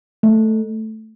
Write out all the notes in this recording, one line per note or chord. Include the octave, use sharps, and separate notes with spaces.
A3